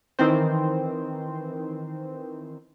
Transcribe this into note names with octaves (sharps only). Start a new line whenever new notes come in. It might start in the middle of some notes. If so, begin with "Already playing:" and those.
D#3 E3 C4 C5